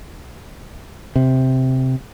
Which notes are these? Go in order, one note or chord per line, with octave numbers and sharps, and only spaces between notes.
C3